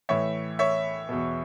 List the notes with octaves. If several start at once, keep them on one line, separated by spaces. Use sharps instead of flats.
A2 E3 C#5 E5
C#5 E5
E2 B2